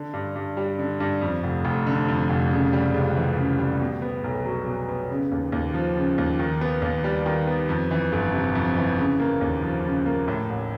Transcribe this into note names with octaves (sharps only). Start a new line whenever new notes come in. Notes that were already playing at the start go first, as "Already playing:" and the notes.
Already playing: D3
G2
G2
G3
D3
G2
F2
F1
F1
D3
F2
F1
C#3
G3
C#2
E3
C#3
G3
B2
B3
B1
F#3
B2
B3
C#3
D#2
D#2
F3
C#3
D#2
D#3
B3
D#2
G3
D#3
B3
F2
E3
G1
C3
F2
E3
C#3
A#3
D#2
F3
C#3
A#3
A2
A1